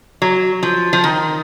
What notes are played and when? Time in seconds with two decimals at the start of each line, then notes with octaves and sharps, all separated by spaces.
0.22 F#3
0.63 F3
0.93 F3
1.04 D#3